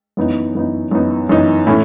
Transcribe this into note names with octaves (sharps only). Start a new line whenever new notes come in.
F#2 E3 B3 D#4
F#2 E3 B3 D#4
F#2 E3 B3 D#4
F#2 E3 B3 D#4
A2 E3 A3 C#4